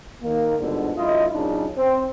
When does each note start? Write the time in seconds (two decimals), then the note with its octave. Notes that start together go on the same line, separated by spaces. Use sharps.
0.23 D#3 A#3
0.58 G1 G#2 B2 D3
0.97 G#1 F#2 E4 F4 D#5
1.33 F#2 A#2 C#3 D4 D#4
1.78 C4